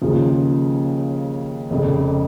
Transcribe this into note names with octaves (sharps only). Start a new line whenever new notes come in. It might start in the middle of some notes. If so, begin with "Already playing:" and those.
D#2 C#3 F3
F1 F2 C#3